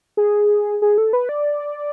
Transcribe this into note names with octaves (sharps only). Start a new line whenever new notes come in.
G#4
G#4
A4
B4
D5